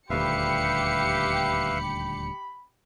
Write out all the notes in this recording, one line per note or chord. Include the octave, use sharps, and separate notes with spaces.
D#1 D2 G4 B4 E5 F5 B5 C#7